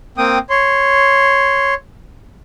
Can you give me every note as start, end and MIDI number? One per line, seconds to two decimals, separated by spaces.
0.18 0.38 58
0.18 0.38 60
0.18 0.38 79
0.18 0.38 87
0.50 1.74 73
0.50 1.74 84